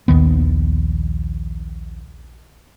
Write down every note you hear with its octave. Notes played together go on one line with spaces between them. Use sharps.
A#1 D#2 D#3 B3